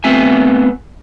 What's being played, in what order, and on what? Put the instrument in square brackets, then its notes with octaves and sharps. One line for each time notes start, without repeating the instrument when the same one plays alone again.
[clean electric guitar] A3 B3 C4 E5 G#5